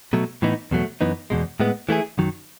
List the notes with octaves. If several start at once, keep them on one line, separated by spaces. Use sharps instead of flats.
B2 F#3 A3
A2 E3 B3 D#4
E2 B2 F#3 A3
F#2 E3 B3 D#4
E2 B2 G#3
A2 G#3 B3
E3 A3 E4 G#4
F#2 D#3 F#3